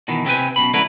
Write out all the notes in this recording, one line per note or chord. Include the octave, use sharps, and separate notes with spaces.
B2 D#3 E3
C3 C4 C#4 G4 B4 G#5
F#2 B2 B5
F#2 D3 A3 E4 A#4 B4